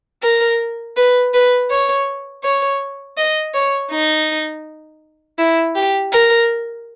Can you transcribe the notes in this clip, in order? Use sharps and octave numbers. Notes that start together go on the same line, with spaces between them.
A#4
B4
B4
C#5
C#5
D#5
C#5
D#4
E4
G4
A#4